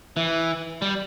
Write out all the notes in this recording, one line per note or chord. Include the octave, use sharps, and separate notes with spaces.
E3
G3